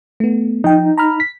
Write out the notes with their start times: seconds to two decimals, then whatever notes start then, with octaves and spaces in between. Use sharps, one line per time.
0.20 A3 B3
0.64 F3 D#4 G5
0.98 A#5 B5 F6
1.20 B6